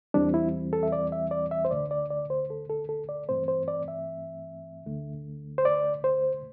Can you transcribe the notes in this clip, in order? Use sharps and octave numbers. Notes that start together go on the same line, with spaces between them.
E2 E3 G3 C4 D4
E4
A4
E5
D5
E5
D5
E5
C5
D2 D3 A3 D5
D5
D5
C5
A4
A4
A4
D5
G2 E3 A3 C4 C5
C5
D5
E5
D2 D3 A3
C5
D5
C5